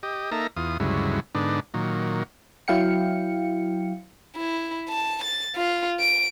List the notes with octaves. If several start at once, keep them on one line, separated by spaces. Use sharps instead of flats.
G4 D#5
A#3 D#4 A4 E5 A#5
E2 F4 D#6
D2 G2 C#3 F#3 G#3 E4
G#2 D3 B3 D4 D#4
A#2 D#3 F#3
F#3 E4 F5 G5 C#7
E4
A5
A6
F4
D7